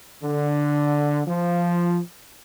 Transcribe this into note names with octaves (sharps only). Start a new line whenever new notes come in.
D3
F3